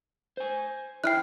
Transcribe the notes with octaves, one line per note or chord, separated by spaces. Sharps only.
C5 G#5
E4 G5 F6 F#6